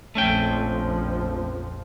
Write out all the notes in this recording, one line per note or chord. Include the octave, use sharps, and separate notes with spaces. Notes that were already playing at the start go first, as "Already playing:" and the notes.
A#1 F2 F3 A3 C#4 G5